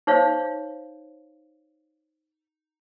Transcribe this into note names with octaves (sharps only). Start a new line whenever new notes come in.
D#4 C5 C#5 F5